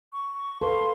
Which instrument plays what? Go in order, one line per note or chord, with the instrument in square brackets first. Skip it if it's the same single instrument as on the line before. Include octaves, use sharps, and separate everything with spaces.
[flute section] C#6
[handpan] A4 B4 [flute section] F5 C6